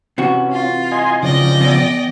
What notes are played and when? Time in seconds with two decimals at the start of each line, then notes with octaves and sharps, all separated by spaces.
0.18 C3 E3 C#4 F#4
0.53 F4
0.92 D#5 G#5 C6
1.23 C#3 F3 D5 D#5 G5
1.61 E2